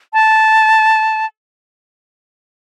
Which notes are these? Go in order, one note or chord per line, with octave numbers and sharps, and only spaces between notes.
A5